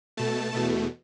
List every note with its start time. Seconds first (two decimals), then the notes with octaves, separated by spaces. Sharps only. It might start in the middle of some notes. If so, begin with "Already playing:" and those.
0.17 B2 A3 A5
0.53 E2 B2 A3